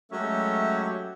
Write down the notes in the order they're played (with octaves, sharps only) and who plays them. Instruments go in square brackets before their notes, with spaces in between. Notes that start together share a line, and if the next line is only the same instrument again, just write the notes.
[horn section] F#3 G#3 A3 C#4 G4 E5